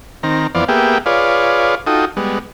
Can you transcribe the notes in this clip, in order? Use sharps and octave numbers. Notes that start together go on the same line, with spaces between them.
D#3 C4 A#5
F2 E3 B3 C5 D5 F5
A#3 B3 G4 G#4 E5 G5
F4 G#4 B4 C#5 D5 F5
D#4 F4 F#4 A4 G5 D#6
G3 G#3 B3